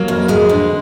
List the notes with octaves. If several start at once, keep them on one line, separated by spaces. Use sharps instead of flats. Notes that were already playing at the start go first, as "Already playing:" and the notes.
Already playing: F#3 A#3
F2
F2 G#3
D3